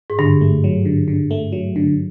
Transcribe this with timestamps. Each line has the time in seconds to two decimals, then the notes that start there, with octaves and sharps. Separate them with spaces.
0.10 G#2
0.19 G2 D3
0.41 A3
0.64 F#3
0.85 D3
1.08 D3
1.31 A3
1.52 F#3
1.76 D3